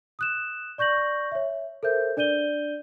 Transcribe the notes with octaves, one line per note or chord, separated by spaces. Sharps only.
D#6 F#6 E7
D5 C#6 G6 A#6 F#7
C#5 E5
A4 A#4 C5 E5 G6
D4 D5 G6 D#7 G7